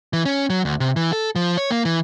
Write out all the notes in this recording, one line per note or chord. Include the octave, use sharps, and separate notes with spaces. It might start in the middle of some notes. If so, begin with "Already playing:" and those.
E3
C#4
F#3
D2
C3
E3
A4
F3
C#5
A#3
E3